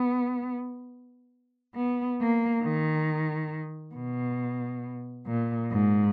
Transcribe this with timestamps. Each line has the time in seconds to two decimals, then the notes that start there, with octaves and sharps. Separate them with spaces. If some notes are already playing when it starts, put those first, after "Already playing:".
Already playing: B3
1.75 B3
2.20 A#3
2.63 D#3
3.95 B2
5.27 A#2
5.71 G#2